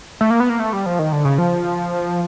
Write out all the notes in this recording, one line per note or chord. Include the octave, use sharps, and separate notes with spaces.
A3
A#3
B3
A#3
A3
G3
F3
D#3
D3
C#3
F3